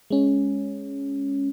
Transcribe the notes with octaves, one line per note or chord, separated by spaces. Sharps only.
G#3 C#4